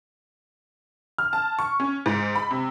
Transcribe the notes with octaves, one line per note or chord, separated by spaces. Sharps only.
F6
A5
C#6
C#4
G#2
B5
C3